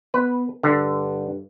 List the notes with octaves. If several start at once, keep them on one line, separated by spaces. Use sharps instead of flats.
B3 B4
G2 D3